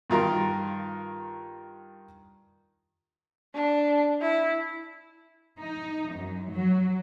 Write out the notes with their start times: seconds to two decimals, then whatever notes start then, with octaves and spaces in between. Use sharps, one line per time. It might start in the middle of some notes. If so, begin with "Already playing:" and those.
0.10 G2 D#3 F4 A#4 C6
3.54 D4
4.21 E4
5.59 D#4
6.14 F#2
6.52 F#3